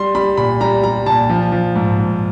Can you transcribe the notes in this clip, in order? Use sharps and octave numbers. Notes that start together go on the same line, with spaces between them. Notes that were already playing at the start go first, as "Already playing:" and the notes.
Already playing: G3 C6
G3 B5
A#2 B5
G3 A#5
G3 A#5
A#2 A5
F3
F3
G#2
G#2